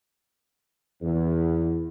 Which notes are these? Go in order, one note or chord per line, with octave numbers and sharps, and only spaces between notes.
E2